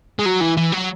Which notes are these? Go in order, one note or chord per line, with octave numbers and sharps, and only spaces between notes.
G#3
F#3
E3
E3
F#3